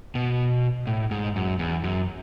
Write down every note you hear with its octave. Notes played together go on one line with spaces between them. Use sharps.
B2
A2
G#2
F#2
E2
F#2